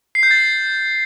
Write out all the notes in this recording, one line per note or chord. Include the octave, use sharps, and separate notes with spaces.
C7
G6
A6